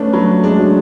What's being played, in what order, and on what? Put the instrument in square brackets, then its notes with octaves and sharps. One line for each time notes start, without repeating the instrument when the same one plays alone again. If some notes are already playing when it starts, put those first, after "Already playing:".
Already playing: [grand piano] A3 C#4 [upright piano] B3 D4
[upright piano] F#3
[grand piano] G#3 [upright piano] D4
[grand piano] F#3